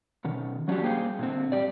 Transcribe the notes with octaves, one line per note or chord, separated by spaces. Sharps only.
B2 D#3 C#4
F#3 C#4 D4 E4 F#4 G4
G3 A#3 G#4 C5 G5
A#2 D3 C4
G2 C3 G4 D5